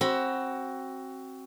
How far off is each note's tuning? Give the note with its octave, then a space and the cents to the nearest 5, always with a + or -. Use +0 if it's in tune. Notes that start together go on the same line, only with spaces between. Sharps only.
C4 +20 F#4 +15 B5 +0